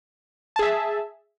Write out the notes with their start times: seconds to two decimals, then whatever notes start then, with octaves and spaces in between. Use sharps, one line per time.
0.56 A5
0.59 G#4
0.62 E5